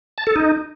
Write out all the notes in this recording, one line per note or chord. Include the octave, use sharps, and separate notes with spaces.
A5
A4
D#4